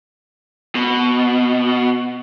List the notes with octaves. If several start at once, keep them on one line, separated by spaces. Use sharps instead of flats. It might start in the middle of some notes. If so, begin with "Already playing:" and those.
B2